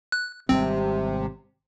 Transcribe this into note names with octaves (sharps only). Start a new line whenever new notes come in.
F#6
G#1 C3 G3 G#3 C4